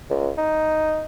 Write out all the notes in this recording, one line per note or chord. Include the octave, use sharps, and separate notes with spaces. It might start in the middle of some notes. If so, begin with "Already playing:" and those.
C#2
D#4